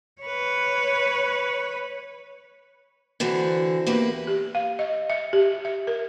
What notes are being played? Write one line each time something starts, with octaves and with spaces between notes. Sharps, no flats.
B4 C#5
D3 E3 C4 F#4
E2 A#3 G4 B4
G4
F5
D#5
E5
G4
E5
A#4